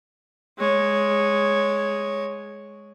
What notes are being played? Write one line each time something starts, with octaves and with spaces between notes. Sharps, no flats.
G#3 C#5